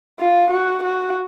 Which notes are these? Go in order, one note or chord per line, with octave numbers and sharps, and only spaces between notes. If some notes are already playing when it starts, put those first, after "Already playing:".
F4
F#4
F#4